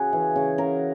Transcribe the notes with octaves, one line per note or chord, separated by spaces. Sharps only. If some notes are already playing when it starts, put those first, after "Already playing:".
Already playing: C#3 C#4 F#4 G#4
E3
C#3
C#3 A#4